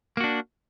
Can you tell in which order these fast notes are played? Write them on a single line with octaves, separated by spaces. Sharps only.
A#3 F#4 D4